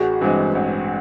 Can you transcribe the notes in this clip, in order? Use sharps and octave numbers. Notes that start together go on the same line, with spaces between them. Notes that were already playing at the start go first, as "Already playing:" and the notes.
Already playing: A1 F#4 G#4
G2 E3 G#3 C4
A1